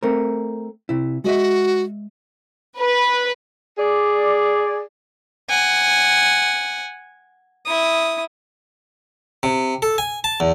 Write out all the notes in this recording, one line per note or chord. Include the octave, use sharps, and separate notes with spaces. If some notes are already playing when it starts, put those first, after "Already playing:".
A3 C4 A#4
C3 E4
G#3 F#4 D#5 E5
B4
G#4 D5
F#5 G#5
E4 D#6
C3
A4
G#5
A5
E2